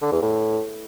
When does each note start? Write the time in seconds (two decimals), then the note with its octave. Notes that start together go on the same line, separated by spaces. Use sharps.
0.02 D3
0.12 E2
0.22 A2